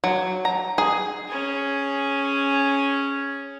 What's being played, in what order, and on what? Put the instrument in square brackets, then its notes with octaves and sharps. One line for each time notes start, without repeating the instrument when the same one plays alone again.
[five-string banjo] F#3
A#5
G#4
[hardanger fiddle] C#4 G#4